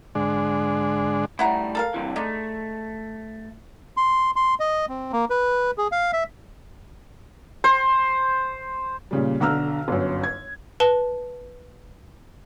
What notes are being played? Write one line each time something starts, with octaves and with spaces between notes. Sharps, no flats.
G#2 D3 G#3 D4
A2 G3 E4 F#5 A#5
A4 A#4 F5
G2 C3 E3
G#3 A3 D4 D#4
C6
C6
D#5
C4
A#3
B4
G#4
F5
E5
C5
A#2 C#3 G3
B1 D3 A#5 E6 F6
G1 F#2
G#6
B4 A5 G7